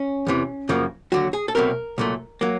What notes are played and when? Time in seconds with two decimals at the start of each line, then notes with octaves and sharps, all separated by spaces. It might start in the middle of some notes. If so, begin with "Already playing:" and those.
Already playing: C#4
0.27 E2 C3 E3
0.69 F#2 C#3 F3 A#3
1.12 D#2 D3 F#3 F#4
1.33 G#4
1.48 A4
1.55 C2 B2 F#3 A3 C4 A#4
1.98 C2 A#2 F#3 A3
2.41 F#3 A#3